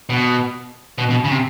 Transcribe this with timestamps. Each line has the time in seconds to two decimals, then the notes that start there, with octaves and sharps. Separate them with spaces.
0.10 B2
0.98 B2
1.10 B2
1.24 C#3
1.31 C3